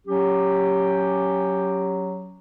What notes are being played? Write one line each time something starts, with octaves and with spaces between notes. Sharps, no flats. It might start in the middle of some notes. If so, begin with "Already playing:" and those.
F#3 C#4 G4